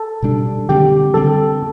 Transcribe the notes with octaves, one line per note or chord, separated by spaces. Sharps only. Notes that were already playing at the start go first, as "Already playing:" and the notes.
Already playing: A4
B2 G3 D4
D3 G3 C4 G4
D3 G3 C4 A4